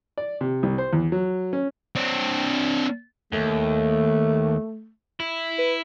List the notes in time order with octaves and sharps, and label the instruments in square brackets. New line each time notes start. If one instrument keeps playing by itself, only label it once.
[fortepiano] D5
C3
C2
C5
E2
F#3
C#4
[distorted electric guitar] C4 D4
[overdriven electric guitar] D#2 [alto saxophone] A3
[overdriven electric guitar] E4
[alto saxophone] B4